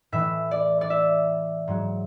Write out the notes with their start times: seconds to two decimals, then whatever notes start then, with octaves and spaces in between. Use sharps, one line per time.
0.12 A2 E3 E5
0.51 D5
0.81 D5
0.90 E5
1.68 G#2 F#3